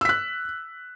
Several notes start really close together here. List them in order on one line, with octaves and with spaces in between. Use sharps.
E6 B6 F#6